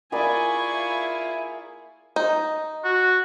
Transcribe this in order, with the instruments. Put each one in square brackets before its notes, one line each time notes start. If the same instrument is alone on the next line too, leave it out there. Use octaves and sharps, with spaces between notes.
[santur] A#3 D5 B5 [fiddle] E4 F4 [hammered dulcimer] G#4 [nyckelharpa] G#5 C#6
[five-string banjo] D#4
[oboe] F#4